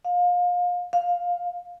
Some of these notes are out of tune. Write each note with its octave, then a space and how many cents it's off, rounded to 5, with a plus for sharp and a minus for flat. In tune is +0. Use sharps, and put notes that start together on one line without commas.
F5 +30
F5 +10